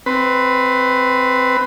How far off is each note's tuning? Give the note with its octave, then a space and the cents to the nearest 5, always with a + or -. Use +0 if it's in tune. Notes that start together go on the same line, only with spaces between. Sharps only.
C4 +0 B4 +15